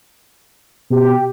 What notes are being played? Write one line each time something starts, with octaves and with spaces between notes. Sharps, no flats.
B2 G4